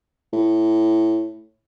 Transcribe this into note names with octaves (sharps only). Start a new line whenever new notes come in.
A2